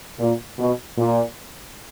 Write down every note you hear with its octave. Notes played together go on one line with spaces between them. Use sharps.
A#2
B2
A#2